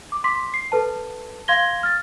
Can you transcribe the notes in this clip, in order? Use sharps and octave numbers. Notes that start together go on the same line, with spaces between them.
D6
C6 D6 B6
C7
A4 B4 A5
F5 C6 G#6 A#6 G7
F6 A6